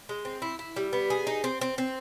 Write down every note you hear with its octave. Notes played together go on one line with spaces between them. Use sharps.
G#3
C4
E4
E4
G3
B3
G#4
D#4
C4
C4
C4